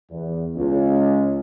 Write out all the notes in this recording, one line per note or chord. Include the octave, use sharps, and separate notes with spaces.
E2
C#2